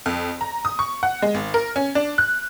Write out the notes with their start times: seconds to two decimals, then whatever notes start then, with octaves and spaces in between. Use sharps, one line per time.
0.06 F2
0.41 A#5
0.65 D#6
0.79 C#6
1.03 F#5
1.22 G#3
1.34 G#1
1.54 A#4
1.76 C#4
1.95 D4
2.18 F#6